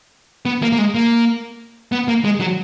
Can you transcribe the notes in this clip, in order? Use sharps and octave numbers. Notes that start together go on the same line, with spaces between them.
B3
A#3
A#3
G#3
A#3
B3
A#3
G#3
F#3